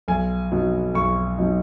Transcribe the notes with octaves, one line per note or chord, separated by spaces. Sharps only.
B1 G#5
B2 F#3 D#4
B1 C#6
B2 F#3 D#4